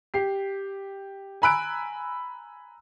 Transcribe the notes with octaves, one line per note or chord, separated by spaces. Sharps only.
G4 C7
G#5 A#5 B5 E6 F#6 D7